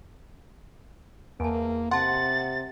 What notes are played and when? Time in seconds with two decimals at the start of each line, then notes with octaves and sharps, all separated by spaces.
1.40 E2 A#3 G#5 A5
1.91 C3 F#5 A5 C6 A6